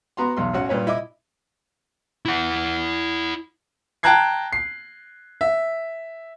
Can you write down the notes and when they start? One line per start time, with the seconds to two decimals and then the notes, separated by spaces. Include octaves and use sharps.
0.17 B3 F#4 A#5 C6
0.36 B1 E2 C6
0.53 A1 C#4 F#4 F#5
0.69 G2 A#2 B4 C#5
0.87 E4 D#5 E5 D6
2.25 E4 F#5
4.03 G5 A5 A#5 F#6 G#6 C7
4.53 C7
5.41 E5